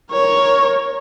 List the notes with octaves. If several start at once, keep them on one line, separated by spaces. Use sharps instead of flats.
A#4 C#5